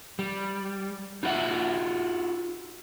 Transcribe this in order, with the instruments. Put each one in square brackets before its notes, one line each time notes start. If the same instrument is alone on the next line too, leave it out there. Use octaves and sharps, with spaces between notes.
[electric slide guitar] G3
D#4 F4 F#4 G#4 E5 F#5